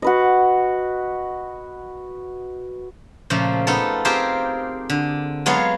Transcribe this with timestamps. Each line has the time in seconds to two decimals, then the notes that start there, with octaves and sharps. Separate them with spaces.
0.02 F#4 B4 D#5
3.30 A#2 C#3 F3 A3
3.67 B3 D#4 F4 A4
4.05 C4 F4 G4 G#4 A#4 C5
4.90 D3
5.46 F#3 G#3 B3 F4 C#5 F5